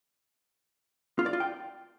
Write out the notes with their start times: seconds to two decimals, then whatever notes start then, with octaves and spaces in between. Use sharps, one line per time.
1.19 F4
1.26 D5
1.33 F4
1.40 G5